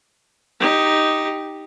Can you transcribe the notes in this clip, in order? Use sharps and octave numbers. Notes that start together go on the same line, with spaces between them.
D#4 G4